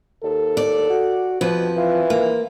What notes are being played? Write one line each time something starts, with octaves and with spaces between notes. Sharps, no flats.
D#2 A4
D5
F#4
F2 B2 F3 B4
E3 F4
A#3